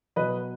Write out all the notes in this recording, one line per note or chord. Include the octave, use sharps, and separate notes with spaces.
B2 F#3 B4 D#5